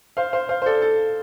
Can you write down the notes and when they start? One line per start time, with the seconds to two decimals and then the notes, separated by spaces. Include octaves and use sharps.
0.17 C5 F5
0.33 C5 F5
0.49 C5 F5
0.62 C5
0.66 A4 D5
0.82 A4